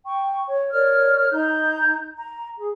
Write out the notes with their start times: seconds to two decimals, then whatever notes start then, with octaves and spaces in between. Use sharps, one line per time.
0.05 G5 C#6
0.46 C#5
0.71 A#4 C#5 D5 F6
1.31 D#4 A#5 G6
2.17 A#5
2.56 G#4